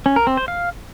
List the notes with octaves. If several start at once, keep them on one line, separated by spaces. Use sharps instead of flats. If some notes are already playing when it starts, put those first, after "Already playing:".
C#4
A#4
C4
C5
F5